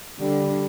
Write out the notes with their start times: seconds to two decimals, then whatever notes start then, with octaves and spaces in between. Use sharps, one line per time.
0.21 D3 G3